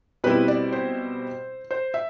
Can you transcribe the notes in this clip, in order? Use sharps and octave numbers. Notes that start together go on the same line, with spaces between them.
B2 G3 C4 E4 B4
D5
C5
C5
E5